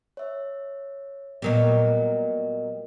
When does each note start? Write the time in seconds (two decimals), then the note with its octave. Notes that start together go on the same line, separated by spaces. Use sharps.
0.17 C#5 E5
1.42 A#2 F#3 G3 B3 A#4 D#5